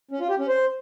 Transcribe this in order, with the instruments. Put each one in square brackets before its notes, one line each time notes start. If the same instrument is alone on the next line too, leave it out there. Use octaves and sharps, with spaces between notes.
[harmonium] C#4
F4
G4
C#4
C5